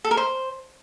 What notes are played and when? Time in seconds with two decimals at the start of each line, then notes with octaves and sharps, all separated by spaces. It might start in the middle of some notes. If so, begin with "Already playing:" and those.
0.05 A4
0.11 A#4
0.17 C5